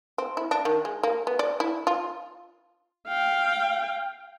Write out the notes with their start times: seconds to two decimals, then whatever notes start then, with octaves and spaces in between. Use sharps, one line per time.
0.18 C4
0.37 E4
0.51 D4
0.65 D#3
0.85 G#3
1.03 A#3
1.27 B3
1.39 D5
1.60 E4
1.87 F4
3.08 F5 G5